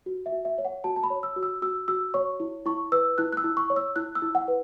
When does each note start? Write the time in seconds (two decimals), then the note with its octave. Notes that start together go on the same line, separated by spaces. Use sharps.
0.06 F#4
0.26 E5
0.32 F#4
0.45 E5
0.58 C#5
0.65 F#5
0.84 F#4 A5
0.96 A5
1.03 B5
1.10 C#5
1.23 E6
1.36 F#4
1.43 E6
1.62 F#4 E6
1.88 F#4 E6
2.14 C#5 C#6
2.40 E4
2.66 E4 C#6
2.92 B4 E6
3.18 E4 F#6
3.32 F#6
3.37 E6
3.44 E4
3.57 C#6
3.70 C#5
3.76 E6
3.96 E4 F#6
4.15 E6
4.22 E4
4.35 F#5
4.48 B4